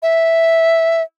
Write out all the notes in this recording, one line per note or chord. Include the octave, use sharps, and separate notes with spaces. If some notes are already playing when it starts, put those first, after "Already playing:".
E5